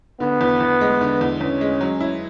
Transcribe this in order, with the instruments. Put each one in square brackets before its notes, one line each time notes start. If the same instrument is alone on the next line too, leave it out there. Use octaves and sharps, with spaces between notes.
[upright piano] D3 [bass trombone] B3
[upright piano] E2
E2
G#3
D3
E2
[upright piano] E2 [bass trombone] C#4
[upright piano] G#3
F#3
E4